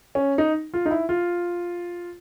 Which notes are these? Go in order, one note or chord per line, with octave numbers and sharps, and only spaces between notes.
C#4
D#4
F4
D#4
E4
F4